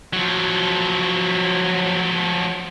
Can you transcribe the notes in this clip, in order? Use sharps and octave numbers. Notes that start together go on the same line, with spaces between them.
F3 F#3